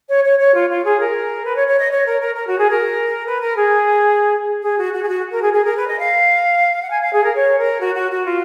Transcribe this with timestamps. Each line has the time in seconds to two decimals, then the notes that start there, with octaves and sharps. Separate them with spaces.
0.09 C#5
0.24 C#5
0.39 C#5
0.54 F4
0.70 F4
0.84 G#4
1.00 A#4
1.45 B4
1.56 C#5
1.67 C#5
1.79 D#5
1.91 C#5
2.06 A#4
2.21 A#4
2.35 A#4
2.47 F#4
2.58 G#4
2.70 A#4
3.26 B4
3.41 A#4
3.56 G#4
4.62 G#4
4.78 F#4
4.93 F#4
5.03 G#4
5.08 F#4
5.31 A#4
5.42 G#4
5.53 G#4
5.64 A#4
5.76 B4
5.87 D#5
5.99 F5
6.82 F#5
6.90 G#5
7.01 F5
7.13 G#4
7.24 A#4
7.35 C#5
7.58 A#4
7.80 F#4
7.95 F#4
8.11 F#4
8.25 F4